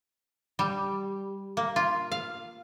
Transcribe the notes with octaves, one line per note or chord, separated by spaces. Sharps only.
G3
A#3
F4
F5